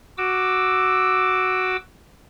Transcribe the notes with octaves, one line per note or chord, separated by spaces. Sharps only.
F#4 D6 E6